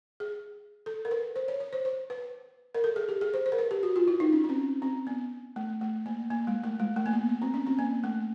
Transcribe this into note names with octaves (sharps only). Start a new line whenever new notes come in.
G#4
A4
A#4
B4
C5
C#5
C#5
C5
C5
B4
A#4
A4
G#4
G4
G#4
C5
C5
A#4
B4
G4
F#4
F4
E4
D#4
C#4
C#4
C4
C4
B3
A3
A3
A#3
A#3
G#3
A3
G#3
A3
A#3
B3
B3
C4
C#4
C4
A#3
A3